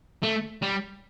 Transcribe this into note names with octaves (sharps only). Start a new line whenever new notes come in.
A3
G3